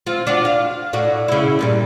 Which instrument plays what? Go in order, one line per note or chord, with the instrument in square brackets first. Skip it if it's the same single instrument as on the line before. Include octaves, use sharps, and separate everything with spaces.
[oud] C4 F4
D4 F4 F#4
F5
A2 D4 F#4
C#3 E4
G2 A#2 G3